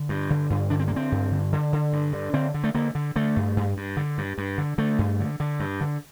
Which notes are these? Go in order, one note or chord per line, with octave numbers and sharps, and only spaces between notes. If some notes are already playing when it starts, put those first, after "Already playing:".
Already playing: D3
G2
D3
G2
D3 D4
C4
D3 A#3
C4
G2
D3
D3
D3
G2
D3
D3 C4
D3
A3
D3 A#3
D3
D3 A3
G2
G2
G2
D3
G2
G2
D3
D3 A3
G2
D3
D3
G2
D3